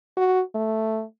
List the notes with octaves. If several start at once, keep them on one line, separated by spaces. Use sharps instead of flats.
F#4
A3